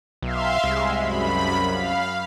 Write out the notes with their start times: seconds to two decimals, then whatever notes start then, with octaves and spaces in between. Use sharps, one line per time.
0.23 B1 E5 F5 C6
0.64 C2 G#3
0.96 F#2 B5
1.73 F5